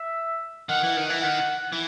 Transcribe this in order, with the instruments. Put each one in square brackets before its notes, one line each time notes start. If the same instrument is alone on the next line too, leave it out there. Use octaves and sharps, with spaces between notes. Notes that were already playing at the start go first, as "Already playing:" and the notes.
Already playing: [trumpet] E5
[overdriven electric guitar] D#3 [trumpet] F#5
[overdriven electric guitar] E3
D#3
E3
[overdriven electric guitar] D#3 [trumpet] F#5
[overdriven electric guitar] E3